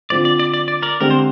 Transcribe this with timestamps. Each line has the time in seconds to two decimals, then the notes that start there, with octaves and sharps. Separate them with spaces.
0.10 D3 F3 C4 F4 C5 D5
0.25 D5
0.39 D5
0.54 D5
0.68 D5
0.82 A#4 D5
1.00 D3 G#3 C4 G4 A#4
1.10 C5